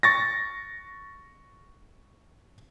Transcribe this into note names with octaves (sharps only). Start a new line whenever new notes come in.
C#6 A6 A#6